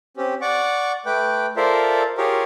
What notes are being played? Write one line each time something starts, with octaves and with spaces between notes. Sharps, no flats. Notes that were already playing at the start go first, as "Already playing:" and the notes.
C4 C#4 G4
D5 F#5 C#6 D6
A3 B4 G5 D6
F4 A4 A#4 C5 D5 E5
F4 G4 G#4 A#4 C#5